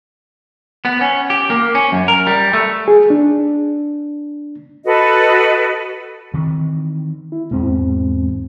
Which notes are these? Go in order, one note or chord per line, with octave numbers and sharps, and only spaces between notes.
B3
C#4
G4
A#3
C#4
F#2
A#4
G3
A3
G#4
D4
F#4 A4 B4 D#5
D#3 E3 C4
E4
E2 G#2 B2 G#3 C4